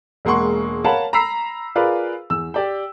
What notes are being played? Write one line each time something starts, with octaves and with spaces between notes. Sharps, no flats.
E1 G#3 A#3 F#5 C6 C#6
A#4 C#5 F5 F#5 A5 B5
A#5 B5 E6 B6 C7
F4 G#4 A#4 B4 D5 F5
E2 E6
G4 D5 G5